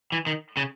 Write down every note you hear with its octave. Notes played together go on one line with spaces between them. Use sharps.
E3
D#3
C#3